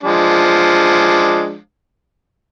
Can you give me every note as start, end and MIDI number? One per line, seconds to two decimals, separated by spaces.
0.03 1.57 53
0.03 1.57 56
0.03 1.57 62